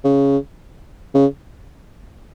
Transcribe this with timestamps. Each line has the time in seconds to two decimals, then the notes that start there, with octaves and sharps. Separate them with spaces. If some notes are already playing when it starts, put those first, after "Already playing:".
0.05 C#3
1.14 C#3